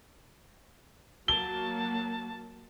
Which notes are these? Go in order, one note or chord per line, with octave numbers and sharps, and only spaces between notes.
F#3 A#3 A5 G7